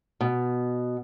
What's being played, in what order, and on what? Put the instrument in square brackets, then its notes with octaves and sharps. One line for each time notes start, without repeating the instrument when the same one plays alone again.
[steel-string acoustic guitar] B2